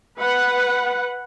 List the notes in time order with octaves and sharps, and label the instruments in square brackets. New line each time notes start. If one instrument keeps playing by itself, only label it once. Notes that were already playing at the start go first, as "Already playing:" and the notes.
[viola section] B4 F#5